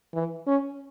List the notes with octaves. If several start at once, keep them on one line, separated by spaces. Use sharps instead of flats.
E3
C#4